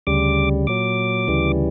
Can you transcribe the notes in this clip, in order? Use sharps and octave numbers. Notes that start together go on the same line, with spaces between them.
D2 C#3 G3 D6
A#2 F#3 D6
D2 C#3 E3 G3